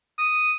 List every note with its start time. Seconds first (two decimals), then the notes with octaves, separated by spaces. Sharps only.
0.18 D#6